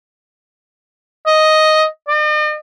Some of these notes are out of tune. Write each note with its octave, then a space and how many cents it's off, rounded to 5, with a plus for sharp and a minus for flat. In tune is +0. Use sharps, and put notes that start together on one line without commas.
D#5 +5
D#5 -45